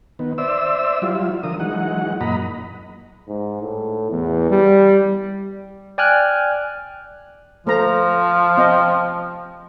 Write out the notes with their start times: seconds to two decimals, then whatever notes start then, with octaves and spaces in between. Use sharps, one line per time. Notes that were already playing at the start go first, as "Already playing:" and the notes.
0.19 D#3 B3
0.38 C5 D5 E5 E6
1.02 F#3 G3 E4 F4
1.43 D3 F3 A#4 D#6
1.60 E3 F#3 G#3 D#4 F#5
2.21 F#2 A#2 D#5 A#5 B5
3.28 G#2
3.61 A2
4.11 E2
4.50 G3
5.98 D5 G5 G#5 F6 F#6
7.67 F3 A3 C5 A#5
8.58 C4 D#5 G5